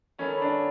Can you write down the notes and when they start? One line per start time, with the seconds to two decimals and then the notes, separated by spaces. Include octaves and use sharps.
0.18 D#3 F#3 B3 C#4 E4 A4
0.42 D4